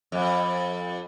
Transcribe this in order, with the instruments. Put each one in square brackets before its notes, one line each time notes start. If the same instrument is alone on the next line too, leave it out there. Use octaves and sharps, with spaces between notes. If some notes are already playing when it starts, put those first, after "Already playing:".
[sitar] F2